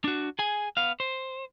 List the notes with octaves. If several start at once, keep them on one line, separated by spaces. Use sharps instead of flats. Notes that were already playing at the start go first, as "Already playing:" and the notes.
D4 F#4
G#4 G#5
B3 F5
C5